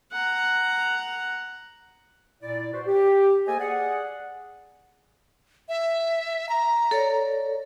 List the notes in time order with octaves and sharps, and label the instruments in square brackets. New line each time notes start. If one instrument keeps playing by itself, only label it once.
[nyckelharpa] F#5 A#5
[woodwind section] A#2 E4 D5
F#4 B4 C5
G4
A#3 G#4 A4 C5 D#5 G#5
G#4 D5 F#5
[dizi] E5
A#5
[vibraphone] A4 C#5 D5